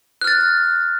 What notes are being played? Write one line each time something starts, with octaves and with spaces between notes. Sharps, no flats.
F6 F#6 A6